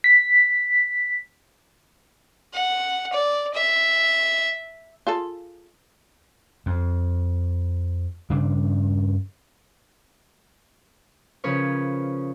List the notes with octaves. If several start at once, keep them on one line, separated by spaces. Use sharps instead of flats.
B6
F#5
D5
E5
F4 G#4 A4
F2
G2 C#3 D4
C#3 F3 C#4 A#4 B4 C#5